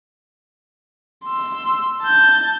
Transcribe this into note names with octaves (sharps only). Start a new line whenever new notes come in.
C6 E6
A5 G6